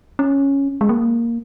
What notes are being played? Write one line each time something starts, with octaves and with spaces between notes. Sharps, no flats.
C#4
G#3
A#3